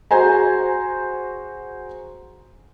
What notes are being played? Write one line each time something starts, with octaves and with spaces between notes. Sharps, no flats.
F#4 G#4 C5 G#5 A#5